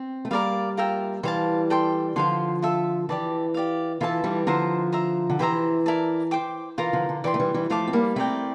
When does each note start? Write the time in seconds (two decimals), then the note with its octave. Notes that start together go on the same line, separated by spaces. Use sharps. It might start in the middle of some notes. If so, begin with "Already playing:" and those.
Already playing: C4
0.25 A3
0.31 G3 A#3 A#4 D5 F5
0.77 F4 A#4 E5 G5
1.23 E3 G3 C5 F5 A5
1.70 A4 D5 G5 C6
2.16 D3 F3 C5 F5 C6
2.62 F4 A4 E5
3.09 E3 G4 D5 A5
3.54 G4 D5 F5
4.01 E3 F4 A4 E5 A5
4.24 E3 G3
4.47 D3 F3 C5 E5 A#5
4.92 C5 E5 A#5
5.30 D3
5.39 E3 G4 C5 E5 A#5
5.86 E4 A#4 D5 A5
6.31 C5 G5 D6
6.78 E3 F4 A#4 F5 A#5
6.93 D3 F3
7.09 D3
7.24 E3 D5 G5 C6
7.34 A3
7.40 E3 G3
7.54 E3 G3
7.70 F3 A3 C5 F5 A5 D6
7.87 C4
7.93 G3 A#3
8.16 A3 C4 E4 A#4 D5 G5